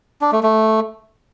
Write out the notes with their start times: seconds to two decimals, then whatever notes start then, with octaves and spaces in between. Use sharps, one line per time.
0.21 D4
0.32 A3
0.43 A3